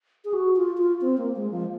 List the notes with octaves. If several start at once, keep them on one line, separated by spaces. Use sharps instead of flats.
G#4
F#4
F4
F4
C4
A#3
G#3
F3